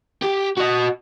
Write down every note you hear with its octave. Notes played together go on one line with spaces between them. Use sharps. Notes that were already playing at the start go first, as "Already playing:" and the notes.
G4
F#4 D#5